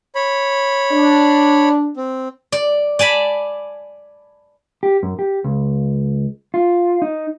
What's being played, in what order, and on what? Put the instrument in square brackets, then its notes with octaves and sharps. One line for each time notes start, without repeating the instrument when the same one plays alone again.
[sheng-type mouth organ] C#5 B5
[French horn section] D4
[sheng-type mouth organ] C4
[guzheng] D5
D5 G#5 A5 B5
[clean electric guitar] G4
F#2
G4
C#2
F4
D#4